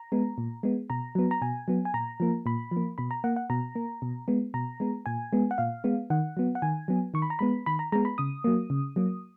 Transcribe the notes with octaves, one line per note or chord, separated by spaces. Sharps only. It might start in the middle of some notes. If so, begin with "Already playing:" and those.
Already playing: A#5
G#3 B3
A#2
G#3 B3
B2 A#5
F#3 B3
A#5
B2 G#5
F#3 B3
G#5
A#2 A#5
F3 A#3
A#2 B5
F3
A#3
B2 B5
A#5
A#3 F#5
F#5
B2 A#5
A#3
B2
G#3 B3
B2 A#5
G#3 B3
A#2 G#5
G#3 B3
F#5
A#2 F5
G#3 B3
D#3 F#5
F#3 B3
F#5
D#3 G#5
F#3 B3
D#3 C#6
B5
A#5
G#3 B3 B5
D#3 B5
A#5
G#3 B3 A#5
B5
C#3 D#6
F#3 A#3
C#3
F#3 A#3